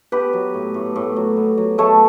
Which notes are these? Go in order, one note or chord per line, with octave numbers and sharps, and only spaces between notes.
B3 G4 B4
F#3
A2
A2
A2
F#3
B3
F#3
A3 A4 C#5